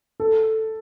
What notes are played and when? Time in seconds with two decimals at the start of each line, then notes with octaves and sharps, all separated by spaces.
0.20 A4